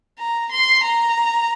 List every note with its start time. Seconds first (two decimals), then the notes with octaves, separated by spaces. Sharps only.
0.19 A#5
0.52 C6
0.85 A#5